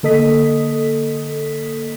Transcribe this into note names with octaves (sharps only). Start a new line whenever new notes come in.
D3 A#3 A4 D#5 D#6 B6